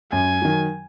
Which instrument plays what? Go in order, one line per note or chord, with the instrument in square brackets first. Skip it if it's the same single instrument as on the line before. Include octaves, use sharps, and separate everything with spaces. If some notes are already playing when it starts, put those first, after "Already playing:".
[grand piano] F#2 [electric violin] G#5
[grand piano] D#3 F#3